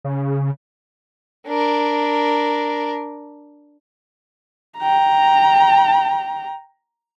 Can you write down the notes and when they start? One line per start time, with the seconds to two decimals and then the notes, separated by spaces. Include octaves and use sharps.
0.05 C#3
1.47 D4 A#4
4.78 G5 A#5